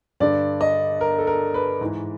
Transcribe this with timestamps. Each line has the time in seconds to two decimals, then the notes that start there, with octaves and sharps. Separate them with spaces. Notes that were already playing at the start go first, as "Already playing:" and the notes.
0.20 G2 D3 D5
0.61 D#5
1.01 A#4
1.18 A4
1.27 A#4
1.54 B4
1.81 G#2 E3